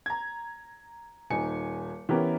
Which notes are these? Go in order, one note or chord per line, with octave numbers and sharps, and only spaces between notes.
A#5 G#6
D#1 D#4 G#5 C#7
E3 B3 C#4 E4 G4 A#4